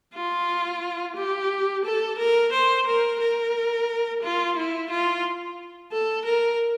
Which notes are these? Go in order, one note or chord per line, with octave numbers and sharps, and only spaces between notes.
F4
G4
A4
A#4
C5
A#4
A#4
F4
E4
F4
A4
A#4